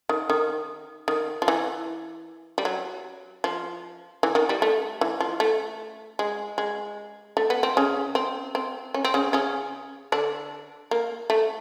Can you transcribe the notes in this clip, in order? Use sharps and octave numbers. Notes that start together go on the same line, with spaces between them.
D#3
D#3
D#3
F3
E3
G3
F#3
F3
E3
D#3
G3
A3
E3
F3
A3
G#3
G#3
A3
B3
C4
C#3 C#4
C4
C4
C#4
C4
C#3 C#4
C#3 C#4
D3 D4
A#3
A3